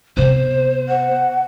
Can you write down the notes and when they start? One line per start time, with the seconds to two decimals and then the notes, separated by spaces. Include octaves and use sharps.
0.17 C3 B3 C5
0.89 F#5